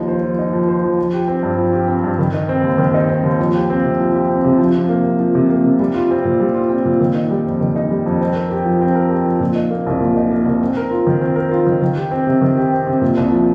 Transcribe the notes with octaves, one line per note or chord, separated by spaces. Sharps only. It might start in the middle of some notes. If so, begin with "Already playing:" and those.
Already playing: D#2 F3 D#4
C5
F3
D#4
F3
C5
F3
F3
G4
C4
G2
F3
G4
C4
G2
D#3
D#4
C4
D#2
D#3
D#4
C4
D#2
F3
G4
C4
C3
F3
G4
C4
C3
F3
C3
A#3
C3
F3
C3
A#3
C3
G3
F4
C4
A#2
G3
F4
C4
A#2
D#3
D#4
G3
F2
D#3
D#4
G3
F2
C4
A#4
G4
F3
C4
A#4
G4
F3
A#2
D#4
A#3
C2
A#2
D#4
A#3
C2
C4
A#4
F4
D#3
C4
A#4
F4
D#3
D#3
G4
C4
C3
D#3
G4
C4
C3
A#2
C2
F3